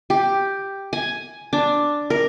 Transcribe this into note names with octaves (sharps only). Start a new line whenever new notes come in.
G4
G#5
D4
A#4